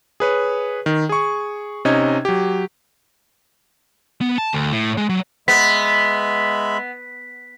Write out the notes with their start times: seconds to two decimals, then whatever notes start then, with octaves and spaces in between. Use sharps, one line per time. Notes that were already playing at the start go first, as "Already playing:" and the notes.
0.20 G#4 B4 C#5
0.86 D#3
1.09 G#4 C#6
1.85 C3 C#4 D#4 D#5 G#6
2.25 F#3 G4
4.21 B3
4.38 A5
4.53 D2
4.73 A2
4.97 G#3
5.09 F#3
5.48 G#3 B3 E5 B5 B6